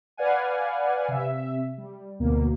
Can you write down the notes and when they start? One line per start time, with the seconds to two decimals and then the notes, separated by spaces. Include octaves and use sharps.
0.17 B4 D5 F5 F#5 G#5
1.08 C3 E5
1.78 G3
2.19 D2 B2 A#3